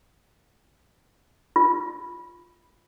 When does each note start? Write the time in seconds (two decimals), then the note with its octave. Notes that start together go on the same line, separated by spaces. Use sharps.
1.56 F4